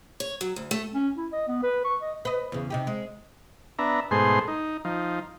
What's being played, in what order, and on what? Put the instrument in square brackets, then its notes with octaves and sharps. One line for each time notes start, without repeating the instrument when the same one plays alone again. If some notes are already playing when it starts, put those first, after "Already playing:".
[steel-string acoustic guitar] C#5
F#3
D2
A3
[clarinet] C#4
E4
D#5
B3
B4
C#6
D#5
[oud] B4 D#5
E2 C#3
C3 D#4 G4
G#3
[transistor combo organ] B3 D4 E5 A#5
G#2 B2 A3 G#4 C5 C6
D#4
F3 D#4